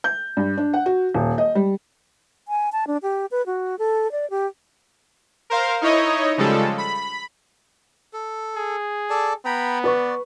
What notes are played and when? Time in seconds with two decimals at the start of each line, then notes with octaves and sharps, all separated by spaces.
0.04 G6
0.37 G2
0.58 D4
0.74 F#5
0.86 F#4
1.14 D#1
1.38 D#5
1.55 G3
2.48 G#5
2.72 A5
2.87 D4
3.03 G4
3.31 B4
3.46 F#4
3.79 A4
4.12 D5
4.30 G4
5.50 A#4 C5 F5
5.81 D#4 E4 C#5 D#5
6.38 C#3 F3 G3 G#3 A4
6.78 B5
8.13 A4
8.56 G#4
9.10 A4 D5 A5
9.45 B3 G5 A#5 B5
9.84 B4 D5 C#6